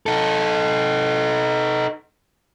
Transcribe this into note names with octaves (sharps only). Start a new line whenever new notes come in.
D#4 A4